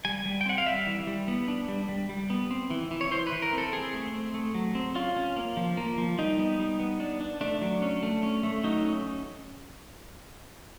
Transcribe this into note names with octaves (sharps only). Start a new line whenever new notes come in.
G3 G#5
G3
G5
C4 F#5
F5
G3 E5
E3
G3
B3
D4
G3
G3
G3
B3
C4
E3
E3
C#5
E3 C5
B4
E3
A#4
C4
A4
C4 G#4
A3
C4
A3
F#3
C4
C#4 F4
C#4
A#3
F3
A#3
F3
G3 D#4
B3
G3
B3
D4
D4
A3 D4
F#3
C#4
A3
C#4
A3
F#3 D#4
C#4